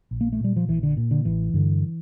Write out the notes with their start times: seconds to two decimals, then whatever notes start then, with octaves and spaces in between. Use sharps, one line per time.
0.11 A#1
0.21 A#3
0.33 A3
0.40 A#2 G3
0.56 F3
0.68 A#1 E3
0.83 D3
0.97 A#2
1.11 D3
1.25 A1 E3
1.54 G2 D3